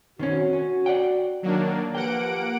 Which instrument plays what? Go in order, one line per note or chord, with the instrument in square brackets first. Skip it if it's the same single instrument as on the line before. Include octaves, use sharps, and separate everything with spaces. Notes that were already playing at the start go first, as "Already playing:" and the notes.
[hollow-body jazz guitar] D#3 C4 C#4 [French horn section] F#4
[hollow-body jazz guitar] C#4
D5 F#5 G5
[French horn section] D#3 [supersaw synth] F#3 A#3 D4
[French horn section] F3 G4 B4 [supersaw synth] A#3 F#5 D7 [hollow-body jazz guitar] G5